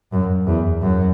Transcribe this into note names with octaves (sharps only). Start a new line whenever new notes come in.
F#2
E2
F#2